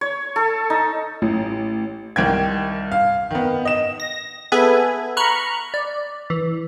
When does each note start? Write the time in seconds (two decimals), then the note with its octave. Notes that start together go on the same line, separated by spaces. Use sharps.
0.01 C#5
0.36 A4
0.70 D#4
1.22 A1
2.16 C2 D#3 G5 G#6
2.92 F5
3.31 D#3 B3
3.65 D#5 E7
4.00 A#6
4.52 B3 G#4 A4 B4 E5 G#5
5.17 A#5 B5 C#6 F6 F#6
5.74 D5
6.30 E3